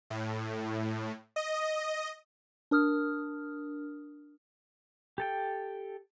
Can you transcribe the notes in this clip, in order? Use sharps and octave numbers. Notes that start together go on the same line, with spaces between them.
A2
D#5
D4 A#4 D#6 F6
G4 A4 G5